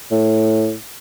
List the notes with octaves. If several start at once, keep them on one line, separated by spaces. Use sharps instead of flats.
A2